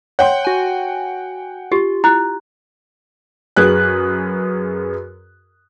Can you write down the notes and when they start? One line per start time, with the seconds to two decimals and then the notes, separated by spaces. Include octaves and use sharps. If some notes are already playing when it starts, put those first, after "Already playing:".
0.19 C#5 F#5 G5 C6
0.45 F#4 G#5
1.72 F4 G4
2.04 E4 A#5 F#6
3.56 F#2 G#4 B4 F#6